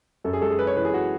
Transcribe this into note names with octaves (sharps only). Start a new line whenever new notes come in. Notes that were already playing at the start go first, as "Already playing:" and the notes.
F#2 A4
G#4
G#3 A4
G#4
G#3 B4
C#5
E3 B4
G#4
F#4